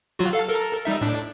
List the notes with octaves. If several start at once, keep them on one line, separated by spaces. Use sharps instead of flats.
F#3 F4 F#4
A4 F5
A4 A#4
G3 D#4 E5
A2 D4